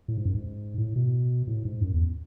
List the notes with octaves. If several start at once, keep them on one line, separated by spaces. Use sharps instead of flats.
A2
G#2
F#2
G#2
A2
B2
A2
G#2
F#2
E2